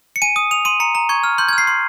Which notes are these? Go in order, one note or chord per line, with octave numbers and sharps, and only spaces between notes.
C#7
G#5 D#7
D#6
D#6 F7
C6 D#7
A#5 C#7
A#5
C#6 G#6
F6
C6 G6
G#6
F6
C7
C6